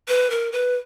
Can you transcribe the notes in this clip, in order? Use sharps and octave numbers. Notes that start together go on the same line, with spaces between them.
B4
A#4
B4